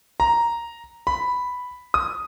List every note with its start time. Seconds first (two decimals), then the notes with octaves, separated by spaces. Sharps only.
0.20 A#5
1.07 B5
1.94 D#6